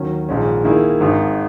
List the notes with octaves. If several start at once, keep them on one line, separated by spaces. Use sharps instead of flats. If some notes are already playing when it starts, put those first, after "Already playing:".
Already playing: D#2 D#3 F#3 C#4
A#1 G#2 D#3 G#3 C#4
D#3 A#3 E4 G#4
G#1 G#2 D#3